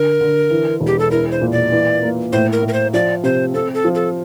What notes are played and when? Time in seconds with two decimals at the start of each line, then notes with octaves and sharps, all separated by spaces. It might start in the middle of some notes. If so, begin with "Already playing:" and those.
Already playing: D3 A#4
0.21 D3
0.51 E3
0.81 E1
0.87 G4
0.99 A4
1.11 E4 A#4
1.31 C5
1.41 A#2
1.52 D5
1.72 E3
2.03 A#3
2.33 A2 C5
2.52 A#4
2.63 A2
2.68 A#4
2.73 C5
2.94 F3 D5
3.23 C3 C5
3.54 C4 A4
3.74 A4
3.85 F3
3.95 A4